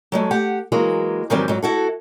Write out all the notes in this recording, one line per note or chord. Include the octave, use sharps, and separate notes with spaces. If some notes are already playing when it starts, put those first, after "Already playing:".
F#3 G#3 A3
G4 F#5
E3 F#3 G#3 A#3
G#2 D#3 E3 F#3 G3 C4
G#2 F#3
E4 F#4 A4